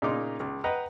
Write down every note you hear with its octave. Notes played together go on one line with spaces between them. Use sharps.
A#2 C#3 A#3 D#4 C6 D6
C#2
B4 D#5 F#5 G5 A#5